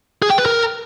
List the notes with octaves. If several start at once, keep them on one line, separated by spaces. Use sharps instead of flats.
G#4
G5
B4
A#4